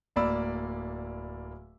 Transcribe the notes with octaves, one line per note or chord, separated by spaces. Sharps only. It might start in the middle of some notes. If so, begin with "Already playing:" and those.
D1 A#3 D5 B5 E6